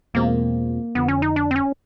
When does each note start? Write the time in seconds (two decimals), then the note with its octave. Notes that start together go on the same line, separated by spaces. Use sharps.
0.14 E2 B2 G#3 A#3 C4 F4
0.95 F2 D3 F3 B3
1.08 C#4
1.22 D#4
1.36 D4
1.51 C4
1.56 C#4